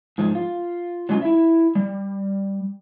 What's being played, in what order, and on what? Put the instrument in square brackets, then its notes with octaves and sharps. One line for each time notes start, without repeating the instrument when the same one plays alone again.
[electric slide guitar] G#2 F3 G#3
F4
F#3 G#3 C#4 F4
E4 E5
G3